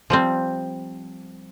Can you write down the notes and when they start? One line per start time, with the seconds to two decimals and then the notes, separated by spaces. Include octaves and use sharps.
0.10 F3 G3 C4